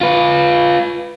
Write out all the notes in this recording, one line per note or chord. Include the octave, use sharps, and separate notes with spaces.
F4 B4